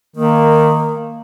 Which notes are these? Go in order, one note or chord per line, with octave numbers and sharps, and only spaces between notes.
D#3 A#3